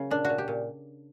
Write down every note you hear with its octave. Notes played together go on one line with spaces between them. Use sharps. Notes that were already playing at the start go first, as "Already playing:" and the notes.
Already playing: C#3 F#3 A#3
A#2 D4
F#4
A#2
G4
A#2